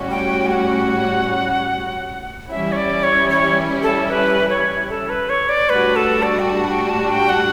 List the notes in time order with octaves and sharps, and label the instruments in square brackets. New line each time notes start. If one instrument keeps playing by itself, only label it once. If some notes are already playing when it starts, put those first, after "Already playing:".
Already playing: [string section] A2 G3 C#4 F#4
[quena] G5
F#5
[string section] E3 G3 C#4 E4 [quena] E5
[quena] C#5
D5
C#5
C#5
A4
B4
C#5
A4
B4
C#5
D5
[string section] A2 G3 D4 F#4 [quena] B4
[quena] A4
D5
G5
A5
G5
A5
G5
F#5